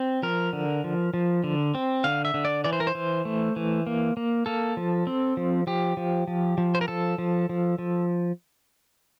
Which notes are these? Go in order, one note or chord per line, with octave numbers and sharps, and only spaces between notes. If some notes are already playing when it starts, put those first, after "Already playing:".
Already playing: C4
F3 A#4
D3
F3
F3
D3
C4
D3 F5
E5
D3
D5
E3 D5
C5
A#4
C5
E3
A3
E3
A#3
A#3
A#3 A4
F3
C4
F3
F3 G4
F3
F3
F3
C5
A#4
F3 A4
F3
F3
F3